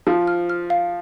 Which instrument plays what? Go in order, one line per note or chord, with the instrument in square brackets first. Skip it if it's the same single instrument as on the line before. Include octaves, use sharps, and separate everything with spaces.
[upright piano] F3 [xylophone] F5
[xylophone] F6
F6
F5